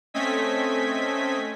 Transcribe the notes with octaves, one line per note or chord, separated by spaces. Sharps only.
A3 C4 C#4 D#5 G#6 B6